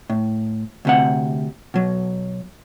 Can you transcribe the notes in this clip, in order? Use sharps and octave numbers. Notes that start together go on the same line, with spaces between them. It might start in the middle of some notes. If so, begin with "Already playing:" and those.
A2
D2 C3 F#5
B2 F#3